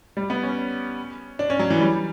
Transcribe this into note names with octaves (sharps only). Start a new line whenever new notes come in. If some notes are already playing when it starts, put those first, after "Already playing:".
G3
B3
C#4
D4
C#4
F#3
E3
G3